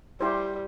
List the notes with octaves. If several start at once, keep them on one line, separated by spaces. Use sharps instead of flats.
G3 E4 G4 C5